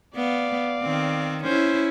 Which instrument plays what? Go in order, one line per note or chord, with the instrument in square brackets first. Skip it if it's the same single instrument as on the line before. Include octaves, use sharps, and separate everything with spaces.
[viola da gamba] B3 [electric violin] D5 F5
[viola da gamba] D#3 C4
[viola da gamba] C#4 E4 [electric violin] C5